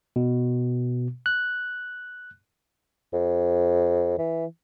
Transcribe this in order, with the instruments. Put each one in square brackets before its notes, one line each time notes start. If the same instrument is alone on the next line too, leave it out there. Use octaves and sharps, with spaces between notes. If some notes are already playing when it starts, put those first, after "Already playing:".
[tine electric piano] B2
F#6
[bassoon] F2
E3